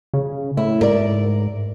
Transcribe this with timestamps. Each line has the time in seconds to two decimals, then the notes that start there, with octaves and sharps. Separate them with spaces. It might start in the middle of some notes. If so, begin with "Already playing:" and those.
0.14 C#3
0.57 A2 E4
0.81 G#2 A#4 D5